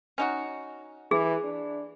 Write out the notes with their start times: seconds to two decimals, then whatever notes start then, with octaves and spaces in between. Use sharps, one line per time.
0.18 C#4 D#4 F#4
1.11 E3 G#4
1.44 D4